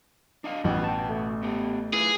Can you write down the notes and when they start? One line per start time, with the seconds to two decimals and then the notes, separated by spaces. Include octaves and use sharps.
0.44 D4 D#5 F5
0.64 A1 G2 B2 E3 B4 F#5
0.84 G5 A5
1.10 A3
1.43 B3 G4
1.93 E4 F4 G#4 B4